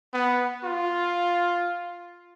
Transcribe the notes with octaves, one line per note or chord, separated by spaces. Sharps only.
B3
F4